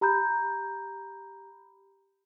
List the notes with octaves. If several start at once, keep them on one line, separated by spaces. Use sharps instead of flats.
G4 A#5 B5 G6